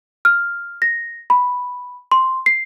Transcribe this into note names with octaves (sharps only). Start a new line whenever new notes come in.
F6
A#6
B5
C6
C7